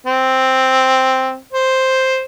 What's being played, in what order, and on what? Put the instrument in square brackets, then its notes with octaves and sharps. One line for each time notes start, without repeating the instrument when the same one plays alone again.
[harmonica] C4
C5